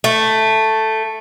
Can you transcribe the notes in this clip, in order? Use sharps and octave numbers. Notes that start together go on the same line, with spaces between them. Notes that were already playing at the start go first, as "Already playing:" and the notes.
A3